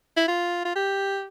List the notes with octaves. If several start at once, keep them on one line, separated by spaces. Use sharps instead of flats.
E4
F4
F4
G4